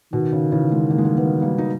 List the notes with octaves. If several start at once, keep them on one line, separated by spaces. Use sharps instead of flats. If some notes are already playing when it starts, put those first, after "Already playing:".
B2 D#3
C#3
C#3 E3
E3 G#3
A#3
G#3
G3 A#3
G#3 B3
G3 A#3
D#4